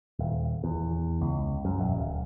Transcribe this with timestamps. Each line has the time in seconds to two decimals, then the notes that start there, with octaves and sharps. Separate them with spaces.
0.19 D#1
0.64 E2
1.21 C#2
1.65 F#2
1.79 E1
1.97 D1